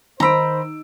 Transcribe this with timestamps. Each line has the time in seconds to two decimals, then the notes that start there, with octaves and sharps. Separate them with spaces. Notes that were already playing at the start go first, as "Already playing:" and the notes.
0.20 D#3 D#4 C5 A#5 B5 E6 D7